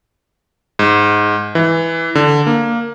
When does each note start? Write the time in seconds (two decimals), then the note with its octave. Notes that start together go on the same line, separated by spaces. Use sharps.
0.79 G#2
1.55 E3
2.15 D3
2.47 A#3